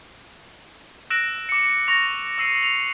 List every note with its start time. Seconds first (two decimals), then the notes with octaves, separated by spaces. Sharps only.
1.10 E6 F#6 A#6 D7 E7
1.49 D6 C#7
1.88 C#6 A#6 F7
2.38 D6 E6 C7 D#7
2.63 F7